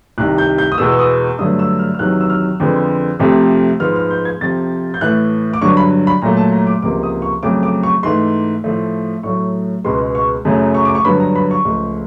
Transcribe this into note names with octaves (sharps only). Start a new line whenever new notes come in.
C2 C3 D#3 F#6
G6
G6
D#6
E2 B2 G#3 B3 E6
E6
D#6
G2 D3 F#3 A3 D#6
E6
F6
F6
E2 C3 D#3 F#3 F#6
E6
F6
F2 D3 F3 G#3 B3
F2 C3 F3 A3
G#2 F3 G#3 B3 F6
F6
G6
G#6
F2 C3 F3 A6
G6
A2 E3 A3 F#6
D6
G2 D3 F#3 C#6
B5
B5
A#2 F#3 A3 A#5
A5
A#5
D6
C#2 C3 F3 A#3 D6
D#6
C#6
F2 C#3 F#3 A3 D6
D6
C#6
G#2 E3 A3 C6
A2 F3 A3
A2 F#3 A3 C#6
C#2 B2 G#3 B3 C6
C#6
F#2 C#3 F#3 A3
C#6
D6
C#6
G2 D3 F#3 B3 B5
A#5
B5
C#6
C#2 C#3 F3 A3